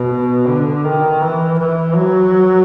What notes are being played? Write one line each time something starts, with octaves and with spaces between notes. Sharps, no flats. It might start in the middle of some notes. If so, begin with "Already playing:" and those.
Already playing: B2
D3
D#3
E3
E3
F#3